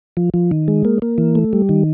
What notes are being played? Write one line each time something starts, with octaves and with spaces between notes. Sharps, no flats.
F3
F3
D#3
G#3
A#3
A#3
E3
A3
G3
D#3